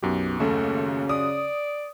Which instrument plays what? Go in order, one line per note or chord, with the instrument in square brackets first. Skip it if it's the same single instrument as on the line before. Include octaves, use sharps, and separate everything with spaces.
[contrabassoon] B1 [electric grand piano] F#2 F#4 G4
[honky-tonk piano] D#2 A3 [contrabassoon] C#3 [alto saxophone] A4
[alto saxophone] D5 [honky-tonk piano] D#6